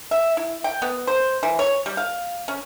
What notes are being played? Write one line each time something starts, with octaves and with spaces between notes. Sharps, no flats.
E5
E4
G5
B3
C5
E3
C#5
G3
F5
C#4